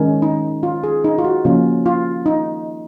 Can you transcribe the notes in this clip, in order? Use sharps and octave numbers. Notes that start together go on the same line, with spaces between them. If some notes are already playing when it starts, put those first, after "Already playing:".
Already playing: D#3 G#3 C#4
D#4
F4
G#4
D#4
F4
F#4
C#3 F3 A#3 C#4 F4
F4
D#4